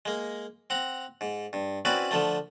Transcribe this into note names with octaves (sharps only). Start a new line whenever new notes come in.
G#3 A#3
C4 F#5 A#5
G#2
G2
C4 C#4 E4 F#4 B4 D5
D3 F3 A3